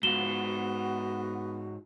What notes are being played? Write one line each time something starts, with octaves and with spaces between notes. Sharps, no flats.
G#2 B3 F4 F#4 E7 G7